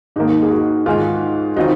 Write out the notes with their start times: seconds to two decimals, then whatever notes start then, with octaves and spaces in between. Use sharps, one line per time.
0.16 G#2 D#3 A#3 D#4
0.42 G#4
0.51 F#4
0.86 G#2 D#3 G#3 F4
1.57 D#3 F#3 C4 D#4 F4